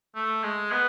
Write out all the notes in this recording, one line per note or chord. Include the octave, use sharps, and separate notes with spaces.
A3
G#3
B3